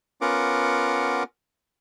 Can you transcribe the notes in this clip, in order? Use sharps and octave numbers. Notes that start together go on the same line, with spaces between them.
B3 C#4 F4 A#4 F#5 D6